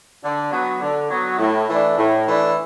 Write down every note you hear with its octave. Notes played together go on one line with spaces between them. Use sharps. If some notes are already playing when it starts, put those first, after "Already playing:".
D3
F#3 B3
D3
F#3 B3
A2
E3 A3 D4
A2
E3 A3 D4